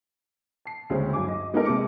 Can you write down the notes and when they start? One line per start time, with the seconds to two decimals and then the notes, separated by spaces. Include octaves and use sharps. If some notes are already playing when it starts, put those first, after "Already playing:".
0.65 A5 C7
0.90 D2 C#3 G#3 C4 C#4
1.13 G2 F#3 G#5 D6
1.28 D#5
1.54 G#3 B3 D#4 F#4 A4 A#4
1.65 C3 G#3 A5 D6 C#7